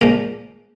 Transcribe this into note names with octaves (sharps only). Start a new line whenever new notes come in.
A#2 F3 G#3 A#3 A#4